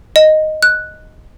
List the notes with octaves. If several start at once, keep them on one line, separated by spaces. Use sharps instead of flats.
D#5
F#6